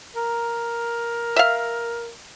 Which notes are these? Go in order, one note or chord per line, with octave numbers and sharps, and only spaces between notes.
A#4
E5 F5